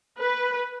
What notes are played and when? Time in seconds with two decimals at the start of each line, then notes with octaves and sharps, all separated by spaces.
0.19 B4